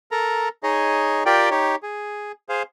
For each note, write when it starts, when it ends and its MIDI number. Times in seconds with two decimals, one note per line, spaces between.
0.12 0.49 69
0.12 0.49 70
0.12 0.49 82
0.63 1.24 63
0.63 1.24 68
0.63 1.24 73
0.63 1.24 75
1.26 1.49 65
1.26 1.49 67
1.26 1.49 70
1.26 1.49 74
1.26 1.49 79
1.51 1.76 63
1.51 1.76 67
1.51 1.76 73
1.83 2.32 68
2.49 2.63 68
2.49 2.63 72
2.49 2.63 77